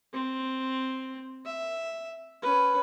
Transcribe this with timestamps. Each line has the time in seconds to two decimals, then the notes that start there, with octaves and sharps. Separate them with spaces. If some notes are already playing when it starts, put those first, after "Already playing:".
0.13 C4
1.46 E5
2.42 C#4 B4